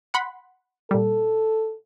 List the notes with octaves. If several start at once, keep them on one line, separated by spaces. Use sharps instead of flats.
F#5 B5 C6
A#2 G3 A4